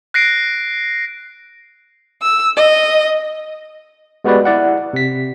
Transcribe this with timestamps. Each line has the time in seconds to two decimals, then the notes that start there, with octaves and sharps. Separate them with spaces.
0.14 F#6 A#6 C7 D7
2.22 E6
2.57 D#5
4.24 G#3 B3 F#4 G4 B4 D5
4.45 E4 D5 F#5
4.93 C3 B6